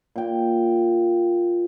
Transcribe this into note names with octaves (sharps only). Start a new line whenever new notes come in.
A#2 G5